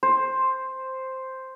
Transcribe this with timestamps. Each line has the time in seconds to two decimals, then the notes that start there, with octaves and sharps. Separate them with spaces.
0.03 C5